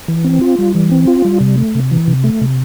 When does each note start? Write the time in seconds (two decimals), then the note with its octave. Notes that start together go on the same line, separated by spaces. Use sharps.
0.08 E3
0.25 C4
0.41 F4
0.59 G3
0.75 E3
0.91 C4
1.07 F4
1.25 G3
1.41 C3
1.58 A3
1.75 C3
1.91 E3
2.08 C3
2.24 A3
2.41 C3